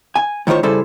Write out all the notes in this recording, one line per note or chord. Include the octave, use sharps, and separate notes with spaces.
G#5
A2 D#3 F4 C5 C#5
C#3 G3 C#4 E4 A4 C5